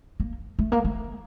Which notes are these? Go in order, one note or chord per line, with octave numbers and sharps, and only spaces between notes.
A#3
A3
A#3
A3